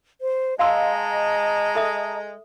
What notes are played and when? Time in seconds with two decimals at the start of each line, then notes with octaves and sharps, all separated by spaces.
0.21 C5
0.59 G#3 D#5 F5 A5 A#5 C6 E6
1.75 A4 E5 D#6